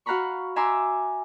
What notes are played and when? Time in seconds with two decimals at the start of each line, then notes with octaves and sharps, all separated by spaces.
0.06 F#4 F5 F#5 A#5 B5 C#6
0.56 E5 G#5 A#5 C6 D6 E6